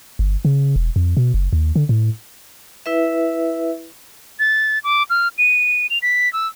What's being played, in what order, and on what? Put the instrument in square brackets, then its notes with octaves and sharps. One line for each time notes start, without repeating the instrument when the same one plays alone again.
[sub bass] G1
C#3
E1
F2
B2
F#1
D#2
D3
A2
[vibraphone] E4 B4 E5
[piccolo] A6
D6
F6
D#7
F7
B6
E6